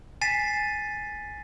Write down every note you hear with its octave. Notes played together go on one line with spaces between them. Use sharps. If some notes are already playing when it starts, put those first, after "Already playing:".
G#5 A6 B6 C7 D#7 E7